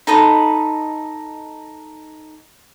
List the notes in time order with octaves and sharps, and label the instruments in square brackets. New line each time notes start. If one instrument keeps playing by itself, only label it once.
[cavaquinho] D#4 A4 D#5 B5